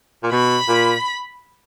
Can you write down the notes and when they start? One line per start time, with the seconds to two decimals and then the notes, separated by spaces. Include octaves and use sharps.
0.23 A#2
0.32 B2 B5
0.68 A#2